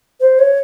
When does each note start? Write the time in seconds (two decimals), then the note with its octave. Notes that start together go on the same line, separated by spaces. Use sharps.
0.20 C5
0.39 C#5